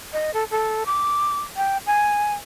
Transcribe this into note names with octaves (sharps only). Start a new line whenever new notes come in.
D#5
A4
A4
D6
G5
G#5